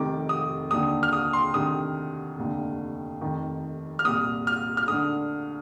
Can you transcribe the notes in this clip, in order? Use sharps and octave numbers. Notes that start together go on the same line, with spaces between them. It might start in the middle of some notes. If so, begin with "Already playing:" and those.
Already playing: F1 F2 C3 D#3 D6
D#6
D#2 D3 D#6
F6
D#6
C6
D2 C3 D#3 D#6
F1 D#2 D3
F1 F2 D#3
F6
C2 A#2 D#6
F6
F6
D2 D3 D#6